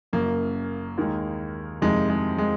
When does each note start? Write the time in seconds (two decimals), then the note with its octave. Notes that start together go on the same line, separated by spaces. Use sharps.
0.13 F#1 F#2 C#3 A#3
0.98 D#2 D#3 G#3
1.82 F2 C3 D#3 G#3
2.10 G#3
2.38 G#3